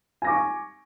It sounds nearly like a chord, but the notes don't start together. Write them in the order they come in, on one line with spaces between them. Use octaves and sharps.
G#5 A#6 D6 C#6